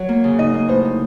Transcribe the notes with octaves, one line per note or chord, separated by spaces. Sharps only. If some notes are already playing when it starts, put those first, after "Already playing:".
Already playing: F#3 C#5
A#3
C#3
D#4 D#5
A#3
A2 C5
D#4